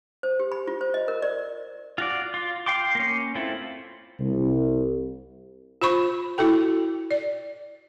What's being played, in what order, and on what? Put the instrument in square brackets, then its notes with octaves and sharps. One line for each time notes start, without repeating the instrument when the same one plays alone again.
[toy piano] C5
G4
B5
F4
C5
D#5
A#4
D5
[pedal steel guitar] F4 F#4 D5
F4
F5 G5 C6 D6
A#3 C#4
A3 C4 E4 F4
[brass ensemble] C2
[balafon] F4 C5 B5 C#6
E4 F#4 A4 G5
D5